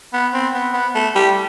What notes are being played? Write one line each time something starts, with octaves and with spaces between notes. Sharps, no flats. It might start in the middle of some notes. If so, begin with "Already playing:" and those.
B3
C4
B3
B3
A3
G3